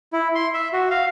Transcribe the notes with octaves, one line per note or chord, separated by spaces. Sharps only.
E4
C6
E5
F#4
F5